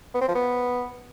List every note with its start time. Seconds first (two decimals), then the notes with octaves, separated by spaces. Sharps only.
0.15 B3
0.21 C4
0.28 F3
0.35 B3